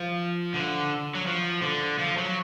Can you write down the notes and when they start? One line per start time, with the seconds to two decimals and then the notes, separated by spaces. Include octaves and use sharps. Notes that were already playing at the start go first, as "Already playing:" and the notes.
Already playing: F3
0.54 D3
1.15 F#3
1.26 F3
1.62 D3
1.99 F3
2.17 F#3